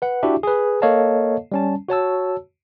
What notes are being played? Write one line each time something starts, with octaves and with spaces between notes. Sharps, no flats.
B4 F#5
D4 E4 F#4 G4 E5
G#4 B4
A#3 A4 C#5 D#5 F5 A5
G3 C#4 A5
F#4 C#5 A5 E6